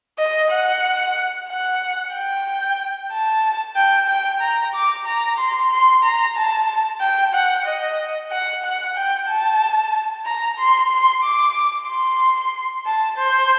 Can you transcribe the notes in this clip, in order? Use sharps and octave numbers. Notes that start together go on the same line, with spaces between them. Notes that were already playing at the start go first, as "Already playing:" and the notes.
D#5
F#5
F#5
G5
A5
G5
G5
A#5
D6
A#5
C6
C6
A#5
A5
G5
F#5
D#5
F#5
F#5
G5
A5
A#5
C6
C6
D6
C6
A5
C5